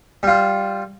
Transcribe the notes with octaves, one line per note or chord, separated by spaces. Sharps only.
G3 F4